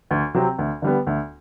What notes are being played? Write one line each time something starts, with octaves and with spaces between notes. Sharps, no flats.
D2
C3 F#3 C4
D2
D3 G3 B3
D2